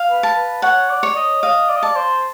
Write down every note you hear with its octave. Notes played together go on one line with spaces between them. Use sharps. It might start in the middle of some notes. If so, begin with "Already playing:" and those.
Already playing: F5
B4
A5
B4
C#5 F#5
D5
C#5
D#5
D#5 F5
D5
D#5
D5 A5
C5